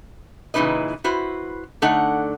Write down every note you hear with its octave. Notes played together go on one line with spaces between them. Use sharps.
A#2 C#3 E3 D#4 B4 D#5
E4 F#4 B4 C5
D3 A3 D#4 F#5